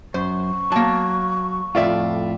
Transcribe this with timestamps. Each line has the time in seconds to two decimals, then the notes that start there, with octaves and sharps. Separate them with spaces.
0.14 F#2 C5 C#6
0.72 F#3 A#3 A5
1.75 F2 A2 F4 D5 E5